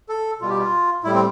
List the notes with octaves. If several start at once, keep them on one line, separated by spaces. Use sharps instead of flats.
A4
B2 G3 F4
G4
F4
A2 G3 E4
C4